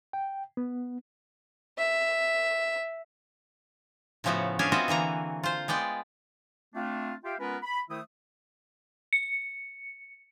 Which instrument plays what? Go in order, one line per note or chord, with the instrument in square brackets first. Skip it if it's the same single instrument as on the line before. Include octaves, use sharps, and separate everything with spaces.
[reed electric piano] G5
B3
[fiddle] E5
[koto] A2 C#3 F3 A3 B3 F#4
C#4 D4 G#4 F5 G#5
B3 C4 F4 F#4 D#5 E5
D3 E3 A#3 A#5
F4 C5
G#3 B3 D5 G5
[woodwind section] A3 C4 D4 F4
F4 G4 E5 F5 G5
G#3 B3 C#4 F4 A#4 B4
B5
D#3 A3 E4 C5 E5 D#6
[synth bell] C#7